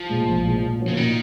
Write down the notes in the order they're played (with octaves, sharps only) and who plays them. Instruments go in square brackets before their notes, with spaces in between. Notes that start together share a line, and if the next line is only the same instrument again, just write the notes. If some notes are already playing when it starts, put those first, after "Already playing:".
Already playing: [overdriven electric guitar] F3
[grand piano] A#2 G#3
A#1
A#2 G#3
A#2
F3 A#3 C#4 F#4
[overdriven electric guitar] C#3
[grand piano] A#2 [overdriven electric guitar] D#3